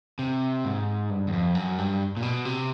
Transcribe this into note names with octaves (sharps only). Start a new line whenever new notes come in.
C3
G#2
G2
E2
F2
F#2
G2
A#2
B2
C3